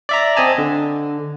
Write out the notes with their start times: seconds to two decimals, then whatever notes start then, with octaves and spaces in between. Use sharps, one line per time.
0.09 D5 E5 A#5
0.37 C4 D#5 G#5 A5
0.58 D3